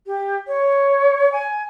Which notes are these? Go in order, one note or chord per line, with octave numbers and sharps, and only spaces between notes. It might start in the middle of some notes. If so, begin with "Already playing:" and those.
G4
C#5
G#5